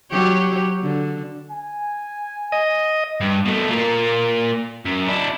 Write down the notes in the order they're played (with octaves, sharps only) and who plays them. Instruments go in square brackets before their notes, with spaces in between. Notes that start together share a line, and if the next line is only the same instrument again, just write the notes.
[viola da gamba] F#3 G4 C#5
D3
[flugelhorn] G#5
[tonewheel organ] D#5
[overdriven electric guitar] G2
B2 A3
A#2 A#3
F#2
D4 E4